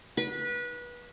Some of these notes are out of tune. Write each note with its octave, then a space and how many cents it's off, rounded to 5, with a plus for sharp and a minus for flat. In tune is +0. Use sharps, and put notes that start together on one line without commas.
B4 -25